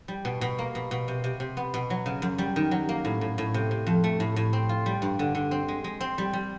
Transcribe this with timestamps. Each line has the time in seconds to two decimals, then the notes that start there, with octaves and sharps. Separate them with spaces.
0.08 G3
0.25 B2
0.41 B2
0.59 A#3
0.75 B2
0.91 B2
1.08 C3
1.24 C3
1.40 C3
1.57 B3
1.74 B2
1.90 F#3
2.06 C#3
2.22 F#2
2.38 G3
2.56 D#3
2.71 F#3
2.89 A#3
3.05 A2
3.21 A2
3.38 A2
3.54 C3
3.71 C3
3.87 F2
4.04 A3
4.20 A2
4.36 A2
4.53 C4
4.69 F4
4.86 G3
5.02 G2
5.19 D3
5.35 D3
5.51 C4
5.68 G#3
5.84 G#3
6.01 C4
6.18 G3
6.33 G3